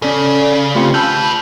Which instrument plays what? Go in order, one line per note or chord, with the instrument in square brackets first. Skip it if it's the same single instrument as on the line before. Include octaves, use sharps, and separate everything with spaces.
[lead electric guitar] C#3 [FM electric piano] C#4 A4 [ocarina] D5
[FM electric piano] A3 C#7 [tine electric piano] C4 F4 G4
[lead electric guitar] G#4 B4 [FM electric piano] G#5 E6 F6 [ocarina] A5 [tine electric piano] G6